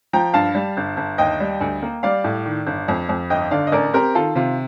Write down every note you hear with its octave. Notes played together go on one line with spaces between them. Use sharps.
F3 G5 A#5
G2 F5 A5
G3
G1
G1
D#2 D#5 G5
G3
D2
A#3
G3 D5 F5
A2
D#3
G1
F2
F2
G1 D#5 G5
D3 D5 F5
D#5
A1 A#4 D5
C4 G4 A#4
D#3 F4 A4
C3 F4